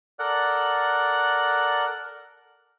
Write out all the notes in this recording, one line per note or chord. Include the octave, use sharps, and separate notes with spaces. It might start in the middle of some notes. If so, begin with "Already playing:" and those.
A4 A#4 D5 F#5 F#6